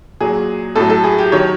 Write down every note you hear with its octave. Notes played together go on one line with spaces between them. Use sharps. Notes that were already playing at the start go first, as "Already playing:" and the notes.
A#2 F#3 G#4
A2 F#3 A4
A4
G#4
G4
D#3 F#3 C#5